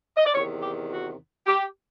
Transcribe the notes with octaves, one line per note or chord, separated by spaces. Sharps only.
D#5
D5
E2 C3 D#3 C#5
G4
F#4
G4